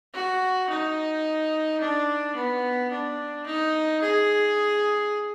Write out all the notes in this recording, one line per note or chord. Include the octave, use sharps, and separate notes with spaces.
F#4
D#4
D4
B3
D4
D#4
G#4